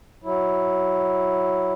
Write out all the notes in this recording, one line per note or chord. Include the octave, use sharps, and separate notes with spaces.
F#3 E4